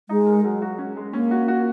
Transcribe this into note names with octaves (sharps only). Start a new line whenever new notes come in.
G#3 D#4
A#4
F#3
F#4
C#4
G#3
A#3 C#4
F#4
F#4